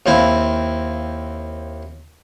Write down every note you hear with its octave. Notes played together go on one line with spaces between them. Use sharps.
D#2 C4 E4 F5